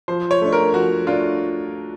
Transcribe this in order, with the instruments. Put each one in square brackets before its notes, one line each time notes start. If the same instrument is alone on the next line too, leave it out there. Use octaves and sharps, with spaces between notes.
[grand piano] F3 [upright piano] C5
[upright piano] C#5
[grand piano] A3 D4
[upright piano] A#4
[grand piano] F3 [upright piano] F#4
[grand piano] A3 D4 [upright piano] F4